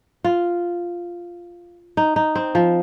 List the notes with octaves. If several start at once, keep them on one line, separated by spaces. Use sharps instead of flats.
F4
D#4
D#4
C4
F3